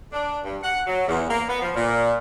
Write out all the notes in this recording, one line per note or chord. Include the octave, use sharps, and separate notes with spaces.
D4
G2
F#5
F#3
E2
A#3
B3
F3
A#2